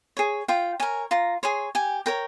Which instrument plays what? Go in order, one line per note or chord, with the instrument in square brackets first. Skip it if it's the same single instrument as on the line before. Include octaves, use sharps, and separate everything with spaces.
[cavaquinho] G#4 C#5
F4 G5
A#4 C#5 G#5
F4 A#5
G#4 C#5 C6
G4 G#5
A#4 C#5 G5